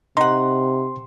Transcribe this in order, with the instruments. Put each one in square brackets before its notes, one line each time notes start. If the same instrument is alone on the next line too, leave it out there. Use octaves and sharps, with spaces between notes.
[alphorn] C3 [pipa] D#4 F#5 [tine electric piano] C6